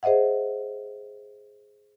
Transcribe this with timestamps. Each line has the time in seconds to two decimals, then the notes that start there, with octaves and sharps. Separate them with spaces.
0.03 G#4 C5 D#5 E5 F#5